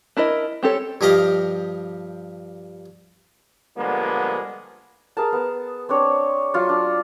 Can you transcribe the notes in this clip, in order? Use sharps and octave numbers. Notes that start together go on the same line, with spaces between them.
D4 E4 A#4 D#5
C4 G4 A4 C#5
G2 F3 G4 D#5 F5
D3 F3 G3 G#3 A#3 B3
G#4 A#4 A5
B3
C4 D4 C#5
F#3 F4
D4